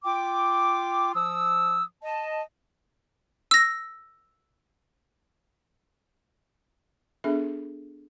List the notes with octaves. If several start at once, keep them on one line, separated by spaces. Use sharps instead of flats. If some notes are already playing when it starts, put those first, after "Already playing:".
F4 G5 D6
F3 D#6 E6
D#5 A5
E6 A#6
B3 D4 G#4 A4 E5